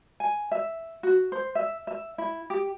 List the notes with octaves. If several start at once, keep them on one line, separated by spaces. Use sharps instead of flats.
G#5
E5
F#4
C5
E5
E5
E4
G4